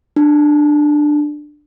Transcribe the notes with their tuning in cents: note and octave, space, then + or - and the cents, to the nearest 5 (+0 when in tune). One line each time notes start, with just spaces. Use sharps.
D4 +15